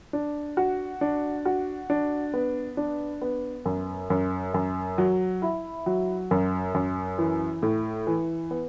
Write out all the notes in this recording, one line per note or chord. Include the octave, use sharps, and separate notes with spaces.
D4
F#4
D4
F#4
D4
B3
D4
B3
F#2
F#2
F#2
F#3
E4
F#3
F#2
F#2
E3
A2
E3
B3